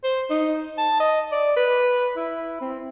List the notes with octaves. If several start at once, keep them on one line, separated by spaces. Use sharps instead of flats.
C5
D#4
A5
D#5
D5
B4
E4
C4